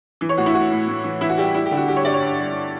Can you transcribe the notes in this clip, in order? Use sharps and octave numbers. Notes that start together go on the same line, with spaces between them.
E3
C#5
A2 F#4
E4
A2 F#4
A2
A2
E3
E3 E4
F#4
G3 G4
G3 E4
G4
D3
F#4
G3 G4
C#5
G2 D5
C#5
G2
G3